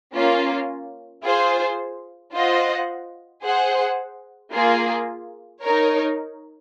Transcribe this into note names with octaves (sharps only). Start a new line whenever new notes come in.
A#3 C#4 F4
F4 G#4 C5
F4 C5 D#5 F#5
G#4 C5 F#5
A#3 F4 G#4
D#4 A#4 C#5